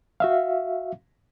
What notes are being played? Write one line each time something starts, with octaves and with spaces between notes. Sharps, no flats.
F#4 E5 F5